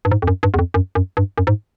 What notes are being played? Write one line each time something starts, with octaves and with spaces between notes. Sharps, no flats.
G2
G#2
F2
F#2
G2
E2
F2
F#2
F#2
G2
F#2
G#2